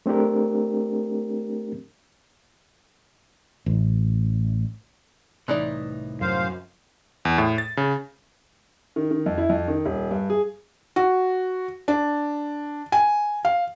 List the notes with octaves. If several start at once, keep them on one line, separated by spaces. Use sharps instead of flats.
A3 C4 D4 G4 A#4
A1
C2 A2 C3 E3 D#4 D5
F#2 C5 F5
E2
A2
A6
C#3
D#3
D#3
F2
E4
F2
D#3
D#1
G2
G#4
F#4
D4
G#5
F5